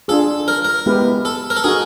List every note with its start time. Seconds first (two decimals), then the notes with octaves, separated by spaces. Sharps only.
0.08 D4 F4 G#4 A4
0.48 A#4
0.65 A#4
0.86 G#3 B3 E4 G4 B4
1.25 A4
1.50 A#4
1.56 A4
1.64 D#4 F#4 G#4 A#4